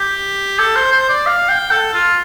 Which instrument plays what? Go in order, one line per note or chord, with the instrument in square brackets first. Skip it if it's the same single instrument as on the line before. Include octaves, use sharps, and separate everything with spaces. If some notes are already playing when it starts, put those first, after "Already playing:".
Already playing: [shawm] G4
A4
C5
C5
D5
F5
G5
A4
F4